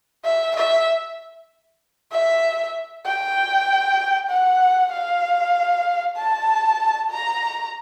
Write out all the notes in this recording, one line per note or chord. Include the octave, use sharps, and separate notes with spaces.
E5
E5
E5
G5
F#5
F5
A5
A#5